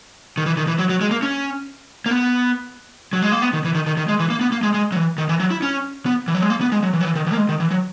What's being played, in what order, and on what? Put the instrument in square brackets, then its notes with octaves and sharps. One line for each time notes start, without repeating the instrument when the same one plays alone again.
[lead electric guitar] D#3
E3
D#3
E3
F#3
F#3
G#3
A#3
C#4
A#3
B3
F#3
G#3
A#3
B3
D#3
E3
D#3
D#3
D#3
G#3
E3
A#3
B3
A#3
G#3
G#3
F#3
E3
D#3
E3
F#3
E4
C#4
B3
E3
F#3
G#3
A#3
B3
G#3
F#3
E3
F#3
E3
D#3
E3
A#3
G#3
D#3
E3
F#3